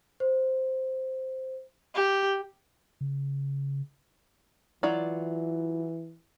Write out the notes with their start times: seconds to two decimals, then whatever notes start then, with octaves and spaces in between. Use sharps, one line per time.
0.20 C5
1.95 G4
3.01 C#3
4.83 E3 F#3 E4 F4 D5